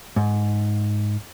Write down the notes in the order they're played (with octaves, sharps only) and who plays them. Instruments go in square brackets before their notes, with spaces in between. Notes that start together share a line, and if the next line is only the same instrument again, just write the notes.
[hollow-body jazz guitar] G#2